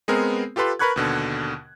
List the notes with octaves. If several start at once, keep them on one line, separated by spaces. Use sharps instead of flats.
G#3 B3 C4 G#4 A#4
F4 G4 A4 B4 C6
A#4 B4 B5 C#6 F#6 G#6
D#2 B2 D3